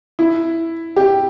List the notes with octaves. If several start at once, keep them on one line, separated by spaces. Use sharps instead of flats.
E4
G4